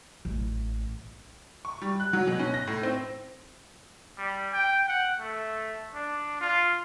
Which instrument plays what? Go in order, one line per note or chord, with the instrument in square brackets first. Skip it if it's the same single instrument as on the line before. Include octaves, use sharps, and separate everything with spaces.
[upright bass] A1 A2
[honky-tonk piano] C#6
G3
F#6
F#3
B2
C#4
A#6
A2
C4
[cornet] G3
G5
F#5
A3
D4
F4